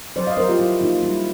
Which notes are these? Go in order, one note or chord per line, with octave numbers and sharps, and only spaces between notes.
F#3 C5 D5
D#5 F5
F#3 A#4 C5
F4 G4
F#3 E4
A#3 D#4 F4
G3 E4